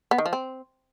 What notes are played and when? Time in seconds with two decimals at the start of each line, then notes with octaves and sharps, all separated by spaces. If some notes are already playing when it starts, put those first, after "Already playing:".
0.11 B3
0.18 D#3
0.26 F3
0.33 C4